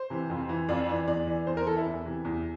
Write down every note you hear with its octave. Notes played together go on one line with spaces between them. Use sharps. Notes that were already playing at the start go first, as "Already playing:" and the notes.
Already playing: C5
C3 E3
F2
E3
F2 D5
E3
E2 D5
E3
E2 C5
A#4
E3 A4
E4
E2
C3 E3
E2